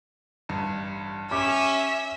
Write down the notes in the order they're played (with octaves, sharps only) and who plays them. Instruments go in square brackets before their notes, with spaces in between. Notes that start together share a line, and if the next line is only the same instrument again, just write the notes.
[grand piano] A1 G2
[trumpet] C#4 [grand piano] G4 [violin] E5 [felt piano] D6